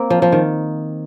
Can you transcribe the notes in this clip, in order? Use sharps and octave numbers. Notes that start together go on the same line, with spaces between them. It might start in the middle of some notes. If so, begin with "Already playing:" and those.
Already playing: A#3 C4
F3
F3
D#3